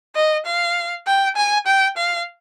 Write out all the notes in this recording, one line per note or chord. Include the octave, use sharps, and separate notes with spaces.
D#5
F5
G5
G#5
G5
F5